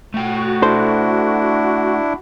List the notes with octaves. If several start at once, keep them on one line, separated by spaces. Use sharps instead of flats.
A3 F#4 G5
D4 E4 A4 C5